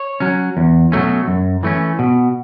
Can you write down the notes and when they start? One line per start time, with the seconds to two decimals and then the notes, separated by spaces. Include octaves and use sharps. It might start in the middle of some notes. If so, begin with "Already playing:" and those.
Already playing: C#5
0.20 F#3 C#4
0.57 E2
0.92 B2 F#3 A3 C#4
1.28 F#2
1.63 E3 A3 C#4
1.99 B2